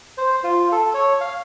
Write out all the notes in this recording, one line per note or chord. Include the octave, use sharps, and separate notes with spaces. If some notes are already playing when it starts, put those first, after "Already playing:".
C5
F4
A4
C#5
F5